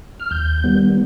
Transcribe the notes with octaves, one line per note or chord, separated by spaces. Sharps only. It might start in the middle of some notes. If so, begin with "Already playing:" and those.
F6
D#2 G6
D#3 G3 B3